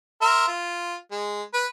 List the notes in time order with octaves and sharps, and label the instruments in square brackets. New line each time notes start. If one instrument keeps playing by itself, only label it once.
[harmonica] A#4 E5 C6
F4
G#3
B4